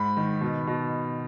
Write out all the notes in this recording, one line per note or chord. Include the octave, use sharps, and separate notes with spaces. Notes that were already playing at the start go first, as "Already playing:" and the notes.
Already playing: G#2 B5
D#3
B2
B2